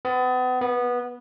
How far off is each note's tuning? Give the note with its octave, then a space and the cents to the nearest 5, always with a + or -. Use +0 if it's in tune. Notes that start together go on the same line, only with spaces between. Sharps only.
B3 +35
B3 -15